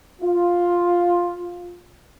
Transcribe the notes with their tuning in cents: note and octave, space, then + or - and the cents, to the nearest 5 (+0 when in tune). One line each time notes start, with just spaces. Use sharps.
F4 +5